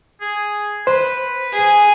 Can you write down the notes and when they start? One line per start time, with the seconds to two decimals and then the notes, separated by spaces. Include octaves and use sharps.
0.21 G#4
0.87 B4 C5
1.53 G#4